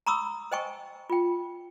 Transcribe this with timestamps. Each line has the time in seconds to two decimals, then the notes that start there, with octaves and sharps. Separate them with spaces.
0.07 A#5 B5 C#6 D#6 E6
0.52 C5 D#5 G5 G#5 C#6
1.10 F4 G5